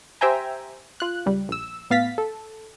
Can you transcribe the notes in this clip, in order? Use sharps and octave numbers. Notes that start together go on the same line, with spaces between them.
G4 C5 E5 G5 G#5 A#5
F4 F#6
C#2 G3
A#1 E6
A2 B3 F5 A6 B6
A4